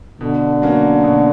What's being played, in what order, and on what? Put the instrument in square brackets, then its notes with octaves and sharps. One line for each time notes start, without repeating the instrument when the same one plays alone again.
[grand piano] B2 [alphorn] D3
[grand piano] F#3 A#3 C#4
B2